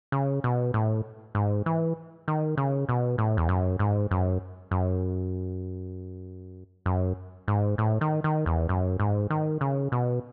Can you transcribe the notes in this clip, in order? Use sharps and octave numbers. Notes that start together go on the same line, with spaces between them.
C#3
B2
A2
G#2
E3
D#3
C#3
B2
A2
E2
F#2
G#2
F#2
F#2
F#2
G#2
A2
D#3
D#3
E2
F#2
G#2
D#3
C#3
B2